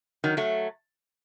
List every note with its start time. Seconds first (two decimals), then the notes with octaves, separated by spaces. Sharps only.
0.24 D#3 F#3
0.37 F#3 A3